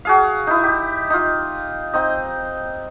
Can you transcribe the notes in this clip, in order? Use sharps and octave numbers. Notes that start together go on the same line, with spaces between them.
F#4 G#4 F5
D#4 E4
G4
D#4 F4
C4 D#4 D#5